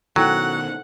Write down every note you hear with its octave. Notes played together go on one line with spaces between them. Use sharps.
B2 D#3 F#3 E4 A4 F#5 G5